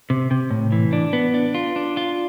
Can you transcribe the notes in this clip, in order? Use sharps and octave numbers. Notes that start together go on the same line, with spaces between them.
C3
C3
A2
E3
D4
B3
D4
F4
D4
F4